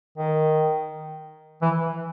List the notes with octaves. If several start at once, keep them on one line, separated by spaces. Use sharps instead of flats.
D#3
E3